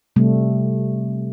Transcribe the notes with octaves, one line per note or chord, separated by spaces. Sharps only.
C3 G3 A3